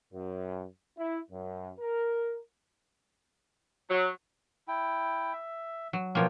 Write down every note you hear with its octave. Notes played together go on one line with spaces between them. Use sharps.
F#2
E4
F#2
A#4
F#3
E4 G5
E5
F#3
B2 F3 A#3 F4 C#5 G5